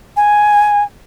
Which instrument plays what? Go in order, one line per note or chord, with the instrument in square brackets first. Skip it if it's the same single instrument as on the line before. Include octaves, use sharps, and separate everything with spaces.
[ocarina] G#5